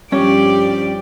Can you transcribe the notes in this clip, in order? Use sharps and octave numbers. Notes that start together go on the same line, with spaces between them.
G2 F3 C#4 G4 D5